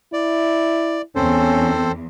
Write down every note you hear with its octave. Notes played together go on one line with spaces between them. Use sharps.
E4 D5
E2 C4 C#4 A4 C5